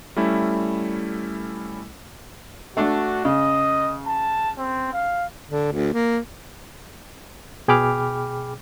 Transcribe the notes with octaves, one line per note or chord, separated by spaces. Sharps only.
G3 A3 C#4 E4
A3 D4 F#4
C#3 D#5
A5
C4
F5
D3
D2
A#3
B2 G#4 G5 B5 D6 F6